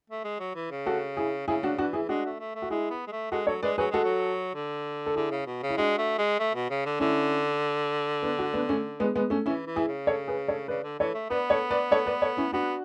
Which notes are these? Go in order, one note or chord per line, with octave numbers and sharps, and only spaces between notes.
A3
G#3
F#3
E3
C#3
F#4 A4
E4 G#4
C#3 E4 G#4
D4 F#4
E3 D4 F#4
E4 G#4
G#3 D4 F#4
A3
A3
A3
F#4
G#3 E4 G#4
B3
G#3
A3
G#3 F#4 A4
F#3 A4 C#5
G#3 B4 D5
F#3 G#4 B4
G#3 F#4 A4
F#3
D3
A4
D3 E4 G#4
C#3
B2
C#3
E4
G#3 D4 F#4
A3
G#3
A3
B2
C#3
D3
D3 C#4 E4
B3 D4
D4 F#4
B3 D4
A3 C#4
G#3 B3
G#3 B3
A3 C#4
E3 C#4 E4
E3
E4 G#4
C#3
A4 C#5
G#4 B4
A4 C#5
C#3 B4 D5
D3
E3 A4 C#5
A3
B3 B4 D5
A4 C#5
B4 D5
A4 C#5
B4 D5
A4 C#5
C#4 E4
B3 D4 F#4